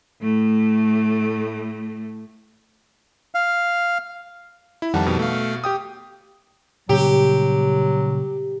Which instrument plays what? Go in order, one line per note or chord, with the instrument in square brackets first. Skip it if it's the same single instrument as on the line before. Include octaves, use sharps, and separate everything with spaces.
[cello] A2 A3
[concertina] F5
[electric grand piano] E4
[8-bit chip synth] F2 D#3 G3 [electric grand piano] F#5 A5
[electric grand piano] B2
[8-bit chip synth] A3 F5
[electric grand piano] G4 G5 D#6
[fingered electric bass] A#2 C#3 G3 [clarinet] F#3 [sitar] G4